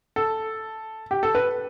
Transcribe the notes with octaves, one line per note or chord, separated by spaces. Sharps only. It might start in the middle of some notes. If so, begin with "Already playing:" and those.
A4
G4
A4
B4